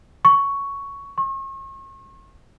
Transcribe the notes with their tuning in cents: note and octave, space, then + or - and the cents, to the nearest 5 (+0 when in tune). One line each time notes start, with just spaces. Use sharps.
C#6 +5
C#6 -40